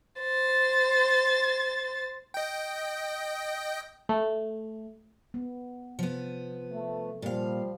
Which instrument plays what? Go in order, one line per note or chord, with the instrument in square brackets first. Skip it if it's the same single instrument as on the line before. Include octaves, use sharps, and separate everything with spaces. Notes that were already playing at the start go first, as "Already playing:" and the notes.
[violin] C5 A6
[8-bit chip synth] D#5 G5
[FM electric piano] A3
[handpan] B3
[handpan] C3 [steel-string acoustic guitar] F3 B3
[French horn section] A3
[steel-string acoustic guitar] A#2 F5 [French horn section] F3 G3